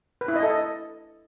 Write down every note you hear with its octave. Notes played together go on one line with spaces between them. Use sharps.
B4
E4
D#5
A4
D#5